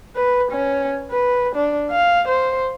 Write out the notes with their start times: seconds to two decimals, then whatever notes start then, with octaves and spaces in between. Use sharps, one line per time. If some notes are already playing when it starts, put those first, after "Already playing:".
0.16 B4
0.52 C#4
1.11 B4
1.56 D4
1.91 F5
2.28 C5